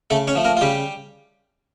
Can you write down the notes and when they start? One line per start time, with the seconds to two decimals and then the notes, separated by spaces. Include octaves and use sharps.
0.10 C#3 A3 A4
0.27 C#4 C#5
0.35 F3 A3
0.45 A#3 A#4
0.57 F4
0.61 C#3 G3 G4